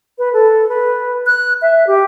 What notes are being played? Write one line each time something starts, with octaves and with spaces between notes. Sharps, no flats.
B4
A4
B4
F#6
E5
G4